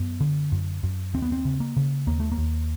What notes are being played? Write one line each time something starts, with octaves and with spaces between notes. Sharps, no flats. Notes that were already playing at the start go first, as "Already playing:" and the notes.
Already playing: F#2 B3
D3
F#2
F#2
D#2 C4
B3
C4
C#3
A#3
C#3
D#2 A#3
A3
A#3
D#2